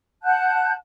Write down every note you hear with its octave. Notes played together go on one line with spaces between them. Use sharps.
F#5 A5 F#6 G6